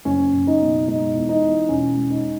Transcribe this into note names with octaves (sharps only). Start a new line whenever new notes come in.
F#1 C#4
F#1
D#4
B2
G#3 D#4
E2
D#4
E2
E1 C#4
G#3
D#4